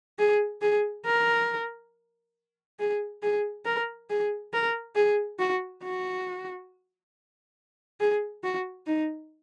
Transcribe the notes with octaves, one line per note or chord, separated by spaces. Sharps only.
G#4
G#4
A#4
G#4
G#4
A#4
G#4
A#4
G#4
F#4
F#4
G#4
F#4
D#4